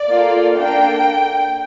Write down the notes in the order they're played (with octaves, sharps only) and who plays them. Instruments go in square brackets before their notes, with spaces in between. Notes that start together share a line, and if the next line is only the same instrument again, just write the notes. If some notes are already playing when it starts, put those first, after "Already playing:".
Already playing: [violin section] D5
A#3 F4 A4
A#3 D4 A4 G5